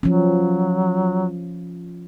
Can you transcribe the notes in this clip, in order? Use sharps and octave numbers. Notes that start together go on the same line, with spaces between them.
F3 F#3 C#4